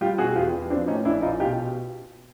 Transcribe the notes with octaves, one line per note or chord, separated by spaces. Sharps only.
G3 F4 G4
B2 F#4 G#4
E2 F4 G4
E2
F3 C4 D4
A2 C#4 D#4
A#1 D4 E4
A#1 D#4 F4
B2 F4 G4